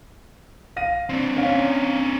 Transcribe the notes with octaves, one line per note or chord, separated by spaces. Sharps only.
F5 A#6 D#7
C4 D4
C#4 F5